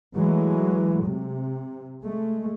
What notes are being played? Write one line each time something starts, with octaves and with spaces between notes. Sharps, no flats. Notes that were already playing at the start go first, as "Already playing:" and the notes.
E3 F#3 G#3 A3
C3
G#3 A3